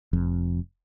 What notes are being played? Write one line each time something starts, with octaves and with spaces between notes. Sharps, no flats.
F1 F2